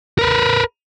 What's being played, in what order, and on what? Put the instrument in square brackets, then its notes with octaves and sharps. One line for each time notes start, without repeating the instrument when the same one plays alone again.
[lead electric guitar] A#4 B4